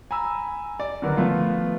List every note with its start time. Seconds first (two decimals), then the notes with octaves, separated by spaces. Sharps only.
0.11 G#5 A#5 B5 E6
0.80 D5
1.02 D3 D#3 F#3 F#4 A#4 B4
1.16 F3 A3 B3 F4